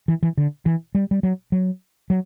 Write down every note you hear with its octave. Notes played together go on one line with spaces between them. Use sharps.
E3
E3
D3
E3
G3
G3
F#3
F#3
F#3